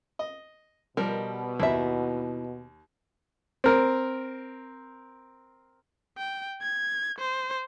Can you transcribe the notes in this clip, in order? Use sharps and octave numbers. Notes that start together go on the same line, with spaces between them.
D#5
B2 F3 G3 A#4
D#2 E4 E5
C4 A#4
G5
G#6
C5